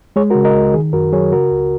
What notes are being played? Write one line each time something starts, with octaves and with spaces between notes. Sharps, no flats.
G#3 G#4 C#5
F#4 A#4
C#3
A#4 D#5
C#2
D#3 G#4
F#2 F#4 A#4
F#3 G#4 C#5
C#3 F#4 A#4
C#2